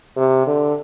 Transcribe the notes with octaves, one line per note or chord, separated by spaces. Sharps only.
C3
D3